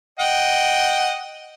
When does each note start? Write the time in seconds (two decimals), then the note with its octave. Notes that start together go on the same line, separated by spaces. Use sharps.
0.19 D#5 F#5 G5